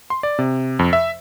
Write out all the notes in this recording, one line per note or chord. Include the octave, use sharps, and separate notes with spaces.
C6
D5
C3
F2
E5